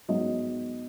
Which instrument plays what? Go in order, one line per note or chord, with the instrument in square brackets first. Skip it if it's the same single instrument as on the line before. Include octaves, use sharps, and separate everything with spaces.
[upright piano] G#2 F#3 B3 D#4 D#5